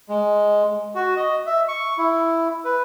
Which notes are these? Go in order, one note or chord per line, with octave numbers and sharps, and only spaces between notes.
G#3
F#4
D#5
E5
C#6
E4
B4